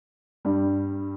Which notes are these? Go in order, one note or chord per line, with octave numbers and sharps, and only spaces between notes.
G2 G3